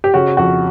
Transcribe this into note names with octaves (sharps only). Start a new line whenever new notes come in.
G4
C#3 F#4
F2 F#4